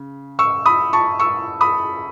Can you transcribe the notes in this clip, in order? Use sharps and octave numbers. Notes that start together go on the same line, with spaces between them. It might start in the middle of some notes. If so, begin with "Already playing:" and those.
Already playing: C#3
C#6 E6
B5 D#6
A5 C#6
C#6 E6
B5 D#6